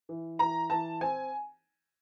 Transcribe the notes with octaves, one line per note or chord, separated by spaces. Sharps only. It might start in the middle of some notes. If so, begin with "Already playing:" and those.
E3
E3 A#5
E3 A5
C4 G#5